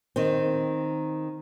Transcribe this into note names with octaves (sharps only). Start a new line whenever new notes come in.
D#3 C4